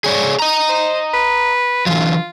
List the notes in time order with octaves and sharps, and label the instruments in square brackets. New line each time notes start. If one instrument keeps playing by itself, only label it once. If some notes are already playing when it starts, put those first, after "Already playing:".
[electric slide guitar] G#4 C#5 D5
D#5 A#5
[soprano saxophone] C5
B4
[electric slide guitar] D3 E3 F#3 [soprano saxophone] F4